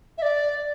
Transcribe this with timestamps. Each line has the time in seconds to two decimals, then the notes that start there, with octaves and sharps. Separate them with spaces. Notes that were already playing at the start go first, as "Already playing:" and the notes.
0.18 E5
0.22 D5